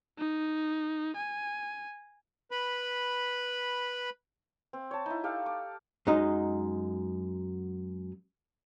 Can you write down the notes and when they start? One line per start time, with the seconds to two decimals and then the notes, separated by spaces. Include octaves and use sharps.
0.18 D#4
1.16 G#5
2.51 B4 B5
4.73 C4
4.91 C#5 A5
5.06 D#4 E4
5.24 G4 A4 F5
5.46 D6
6.07 F#2 F#3 G#3 D#4 D#5